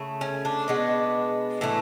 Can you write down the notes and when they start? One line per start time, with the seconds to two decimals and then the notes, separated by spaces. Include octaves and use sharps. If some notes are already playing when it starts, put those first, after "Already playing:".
Already playing: C#3 A3
0.21 C#4
0.45 D4
0.68 B2 G#3 B3
1.61 A2 E3 A3